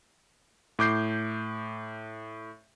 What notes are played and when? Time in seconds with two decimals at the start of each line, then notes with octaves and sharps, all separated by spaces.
0.79 A2 D6 G6 C7